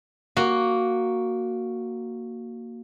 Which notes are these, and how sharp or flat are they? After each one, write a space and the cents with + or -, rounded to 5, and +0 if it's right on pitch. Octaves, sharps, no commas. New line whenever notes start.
A#3 +0 F#4 +0